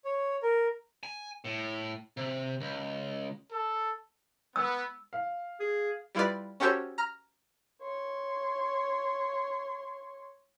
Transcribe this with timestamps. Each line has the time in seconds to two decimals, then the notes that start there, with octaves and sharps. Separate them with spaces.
0.05 C#5
0.43 A#4
1.03 G#5
1.45 A2
2.17 C3
2.61 C#2
3.51 A4
4.56 B3 E6
5.13 F5
5.60 G#4
6.15 G3 E4 F4 B4 D5
6.60 C#4 F#4 G4 A4 C5 C#5
6.98 A#5 F6 A#6
7.82 C#5 C6